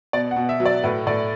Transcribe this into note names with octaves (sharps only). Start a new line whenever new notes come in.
B2 D5
F#5
B2
E5
F#3
D5
A2 B4
A2 D5